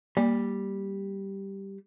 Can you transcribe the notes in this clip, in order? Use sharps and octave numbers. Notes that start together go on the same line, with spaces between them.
G3 A#3